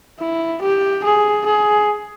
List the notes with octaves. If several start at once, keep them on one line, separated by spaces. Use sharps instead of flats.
E4
G4
G#4
G#4